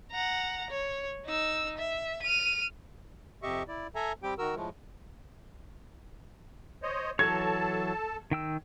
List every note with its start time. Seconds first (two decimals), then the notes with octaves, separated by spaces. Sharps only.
0.11 F#5 A#5
0.71 C#5
1.26 D#4 E6
1.78 E5
2.23 F6 D#7
3.43 F2 C3 G4 D#5 E5 C#6
3.68 E4 D5
3.95 A4 E5 G#5 A#5
4.23 G3 C4 G4 G5
4.39 D#3 F#4 A#4 E6
4.55 A2 F3 G#3 A3
6.83 C5 C#5 D#5
7.19 E3 F#3 A4 C#5 A5 G#6
8.31 D#3 G5 E6